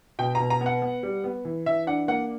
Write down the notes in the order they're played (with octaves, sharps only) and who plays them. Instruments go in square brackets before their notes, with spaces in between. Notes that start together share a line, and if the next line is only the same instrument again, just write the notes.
[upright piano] B2 G5
B2 A#5
A#5
B3
F#5
B3
G3
B3
E3
E3 E5
D4 F#5
A#3 F#5